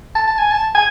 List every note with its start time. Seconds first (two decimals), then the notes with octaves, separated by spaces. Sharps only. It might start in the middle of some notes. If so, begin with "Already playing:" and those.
0.15 A5
0.27 A5
0.39 G#5
0.52 A5
0.75 G#5